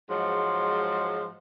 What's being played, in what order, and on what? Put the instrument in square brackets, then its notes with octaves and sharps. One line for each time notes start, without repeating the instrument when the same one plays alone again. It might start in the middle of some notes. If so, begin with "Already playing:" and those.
[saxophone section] G#2 F3 F#3 G#3